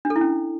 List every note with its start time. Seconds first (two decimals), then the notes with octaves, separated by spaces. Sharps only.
0.05 D4
0.10 A4
0.16 E4
0.21 C#4